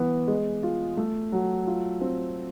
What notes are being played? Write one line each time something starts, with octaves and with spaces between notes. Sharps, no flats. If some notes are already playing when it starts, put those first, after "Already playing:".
Already playing: E3 B3
G#3
F4
A3
F#3
F4
C4